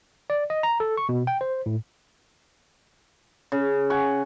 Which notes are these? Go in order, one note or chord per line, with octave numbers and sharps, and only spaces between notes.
D5
D#5
A#5
A4
C#6
B2
G5
C5
A2
C#3
F#5 G#5 C#6